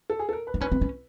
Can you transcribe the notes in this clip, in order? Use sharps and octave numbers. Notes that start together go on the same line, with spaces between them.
A4
G#4
A4
A#4
B4
D4
C#4 B4
C4
C#4